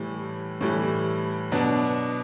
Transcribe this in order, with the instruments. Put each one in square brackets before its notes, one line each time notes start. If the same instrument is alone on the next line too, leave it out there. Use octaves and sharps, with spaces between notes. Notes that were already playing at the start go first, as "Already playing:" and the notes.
Already playing: [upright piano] A2 E3 G3
A2 E3 G3
B2 F#3 B3 D4